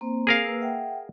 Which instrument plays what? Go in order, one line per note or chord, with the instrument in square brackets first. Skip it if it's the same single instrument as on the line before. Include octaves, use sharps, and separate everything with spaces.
[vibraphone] A#3 C4 C5
[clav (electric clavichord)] G#4 A#4 F5
[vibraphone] A#3 B4 E6
E5 F#5 G5